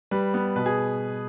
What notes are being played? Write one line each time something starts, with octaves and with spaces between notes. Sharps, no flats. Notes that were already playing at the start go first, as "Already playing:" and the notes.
G3 B4
B3
B2 B4
G#4